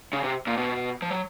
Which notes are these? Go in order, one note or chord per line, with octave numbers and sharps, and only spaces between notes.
C#3
C3
A#2
B2
F3
F#3